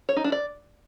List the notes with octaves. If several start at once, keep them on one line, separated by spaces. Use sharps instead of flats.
C#5
D#4
D4
D5